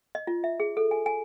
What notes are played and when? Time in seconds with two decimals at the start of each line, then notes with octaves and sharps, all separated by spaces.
0.15 D#5
0.27 F4
0.44 E5
0.60 G#4
0.77 A4
0.91 G#5
1.06 G#5